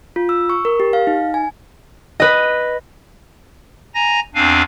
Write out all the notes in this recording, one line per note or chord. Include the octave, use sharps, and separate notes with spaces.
F4
E6
C#6
A#4
G4
F5
D#4
G#5
B4 D#5
G#5 A#5 A#6
E2 C4 D4 F5 G#5